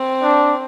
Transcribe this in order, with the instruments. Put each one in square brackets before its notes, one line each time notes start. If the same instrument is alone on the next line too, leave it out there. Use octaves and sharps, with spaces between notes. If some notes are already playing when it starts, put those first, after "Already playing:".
Already playing: [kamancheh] C4
[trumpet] D4